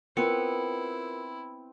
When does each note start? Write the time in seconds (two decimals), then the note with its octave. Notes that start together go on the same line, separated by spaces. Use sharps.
0.17 B3 C4 E4 F4 A#4 C#7